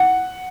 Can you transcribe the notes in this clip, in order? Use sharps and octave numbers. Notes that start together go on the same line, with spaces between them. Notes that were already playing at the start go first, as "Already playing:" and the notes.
Already playing: F#5